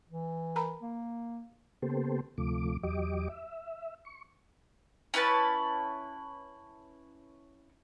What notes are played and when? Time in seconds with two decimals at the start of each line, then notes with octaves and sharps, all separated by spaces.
0.09 E3
0.56 A#4 A#5 B5
0.82 A#3
1.82 C#3 A#3 B3 G4 A4 C5
2.38 D2 C3 F3 A3 D6
2.83 E2 F#3 G4 D#5 D6
3.29 E5
4.05 C#6
5.14 C#4 E4 B4 A5